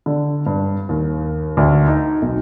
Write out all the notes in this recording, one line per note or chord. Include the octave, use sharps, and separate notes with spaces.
D3
G2
D#2
D2
D#4
B1